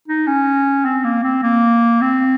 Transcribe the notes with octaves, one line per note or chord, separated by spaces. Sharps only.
D#4
C#4
C4
A#3
C4
A#3
C4